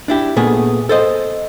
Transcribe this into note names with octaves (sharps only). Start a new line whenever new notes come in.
D4 E4 G4
A#2 A3 B3 G#4
A4 C5 D#5